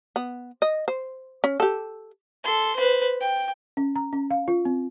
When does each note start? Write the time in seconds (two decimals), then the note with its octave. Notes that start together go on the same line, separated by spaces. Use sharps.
0.16 B3
0.62 D#5
0.88 C5
1.44 C#4
1.60 G4 A4
2.44 A4 C6
2.76 B4 C5
3.21 G5
3.77 C#4
3.96 A#5
4.13 C#4
4.31 F5
4.48 F4
4.65 C4